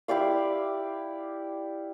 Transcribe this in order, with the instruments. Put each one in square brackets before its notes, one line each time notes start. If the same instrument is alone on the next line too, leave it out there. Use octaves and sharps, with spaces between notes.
[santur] E4 G4 D5 F5